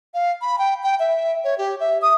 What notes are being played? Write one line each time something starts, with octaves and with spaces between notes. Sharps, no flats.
F5
B5
G5
G5
E5
C#5
G4
E5
D#6